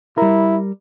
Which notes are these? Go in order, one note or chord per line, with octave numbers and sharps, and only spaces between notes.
G3 E4 A#4